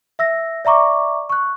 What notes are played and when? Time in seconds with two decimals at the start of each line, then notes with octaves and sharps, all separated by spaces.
0.19 E5 E6 A#6
0.65 D5 E5 A#5 C#6 D6
1.29 C#6 F#6